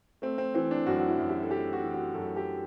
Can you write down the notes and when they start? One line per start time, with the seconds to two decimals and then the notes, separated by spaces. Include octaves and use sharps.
0.22 A3 C4
0.38 C4
0.54 E3 C4
0.71 D4
0.86 F#2 F#4
0.99 F#4
1.08 E4
1.18 F#2
1.29 G4
1.43 A4
1.50 A3 G4
1.73 F#4
1.83 E3
1.94 F#4
2.14 F#2 A4
2.36 G4